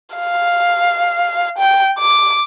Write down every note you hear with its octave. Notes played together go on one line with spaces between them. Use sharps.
F5
G5
D6